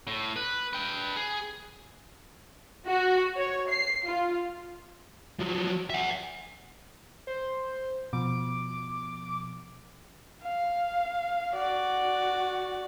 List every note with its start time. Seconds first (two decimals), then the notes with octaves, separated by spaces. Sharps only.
0.07 A2
0.36 B4
0.73 B4 G5
1.16 G#4
2.86 F#4
3.37 C#5
3.70 C7
4.07 F4
5.40 F3 F#3
5.90 E5 F#5
7.27 C5
8.13 B2 F3 D6
10.42 F5
11.54 F#4 D5